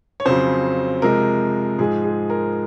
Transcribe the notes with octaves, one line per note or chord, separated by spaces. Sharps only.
C#5
F2 C#3 F#3 C5
C3 F3 G#3 A#4
G#2 F3 G#3 G#4
G#4
A#4